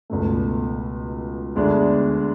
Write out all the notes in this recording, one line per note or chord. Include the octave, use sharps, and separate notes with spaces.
C#2 B2 A3
D2 D3 G#3 B3 D4